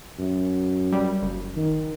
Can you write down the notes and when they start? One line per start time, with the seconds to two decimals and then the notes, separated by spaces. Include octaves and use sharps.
0.18 F#2
0.92 G3
1.22 F#1
1.56 D#3